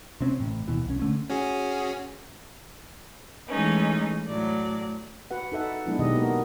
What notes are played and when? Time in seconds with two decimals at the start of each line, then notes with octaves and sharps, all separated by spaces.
0.20 C3 C4 C#4
0.40 A1 A2
0.68 D#2 B2 E3
0.86 C2 C#4
1.00 D3 A3 C#4
1.29 C#4 F#4 G#4
3.48 E3 G#3 A3 C#4 D#4
4.28 A2 F#3 D5
5.31 F#4 B4 F#5
5.52 D#4 A4 E5 F#5
5.86 F#3 G#3 B3 D4 E4
5.99 B2 D#3 G4 D#5
6.15 A#3 F#4 A#4